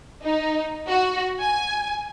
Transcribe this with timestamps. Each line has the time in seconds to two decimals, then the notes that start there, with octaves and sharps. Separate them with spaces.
0.22 D#4
0.87 F#4
1.40 G#5